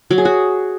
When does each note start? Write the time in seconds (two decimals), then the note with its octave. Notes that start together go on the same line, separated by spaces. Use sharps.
0.11 F#3
0.18 G#4
0.25 F#4